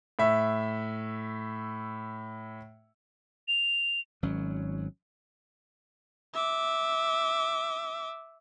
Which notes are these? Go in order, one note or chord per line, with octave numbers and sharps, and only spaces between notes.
A2 E5
F7
G#1 F#3 C#4
E5 D6